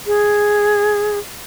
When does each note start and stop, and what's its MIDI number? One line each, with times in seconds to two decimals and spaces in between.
0.07 1.18 68